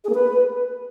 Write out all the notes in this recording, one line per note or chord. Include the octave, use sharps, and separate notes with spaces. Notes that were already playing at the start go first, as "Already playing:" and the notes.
G#4
A#3
B4